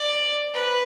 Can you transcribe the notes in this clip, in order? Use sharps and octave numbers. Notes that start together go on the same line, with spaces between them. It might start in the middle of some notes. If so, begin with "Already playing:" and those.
Already playing: D5
B4